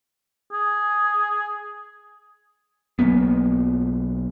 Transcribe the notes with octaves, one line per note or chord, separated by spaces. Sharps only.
G#4
B1 F#3 A#3 B3